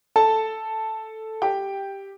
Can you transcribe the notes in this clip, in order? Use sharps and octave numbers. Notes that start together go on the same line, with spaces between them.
A4 A5
G4 G5